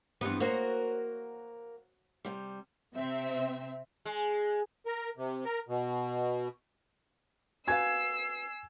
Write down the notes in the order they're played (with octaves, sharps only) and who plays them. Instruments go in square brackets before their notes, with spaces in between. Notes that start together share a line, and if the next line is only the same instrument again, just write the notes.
[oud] G2 G3 B3 [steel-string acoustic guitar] E3 C4
[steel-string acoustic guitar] A#3 A#4 [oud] F#4 C5 C#5
[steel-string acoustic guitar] C3 G3
[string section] C3 C4 E5
[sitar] G#3
[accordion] A#4
C3
A#4
B2
[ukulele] F#4 B4 F5 [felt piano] G#5 G#6 [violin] E6 C7